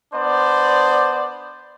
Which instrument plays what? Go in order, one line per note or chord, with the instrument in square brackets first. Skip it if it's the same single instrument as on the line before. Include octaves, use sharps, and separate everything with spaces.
[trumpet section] B3 D4 C5 D5